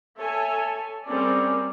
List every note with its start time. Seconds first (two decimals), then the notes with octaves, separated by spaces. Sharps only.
0.16 A4 C#5 E5 G#5 A5
1.06 G3 C4 C#4 G#4 A#4 D5